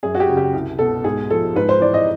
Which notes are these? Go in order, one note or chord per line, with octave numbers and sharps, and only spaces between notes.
F#2 G#4
F#4
G4
C#3
G4
C2
B2 A4
G#2 G#4
F3 A4
G#2 B4
C5
E3 D5
D#5